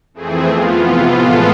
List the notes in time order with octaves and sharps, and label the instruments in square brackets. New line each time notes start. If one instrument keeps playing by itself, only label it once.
[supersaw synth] F2 E3 A3 C4 G#4
F3 B3 F4
C3 E3 B3 F4
A2 G#3 B3 F4 A4